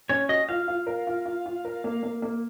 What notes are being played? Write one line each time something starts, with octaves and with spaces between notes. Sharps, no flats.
C#4 C#5
F#4 D#5
F4 F5
F4
A#4
F4
F4
F4
A#4
A#3
A#3
A#3